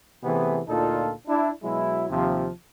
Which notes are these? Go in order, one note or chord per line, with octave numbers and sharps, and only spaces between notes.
C3 E3 A3 B3 E4 G#4
D2 A#2 D4 D#4 F4 A4
D4 E4
B2 F#3 G#3 E4
D#2 C3 F3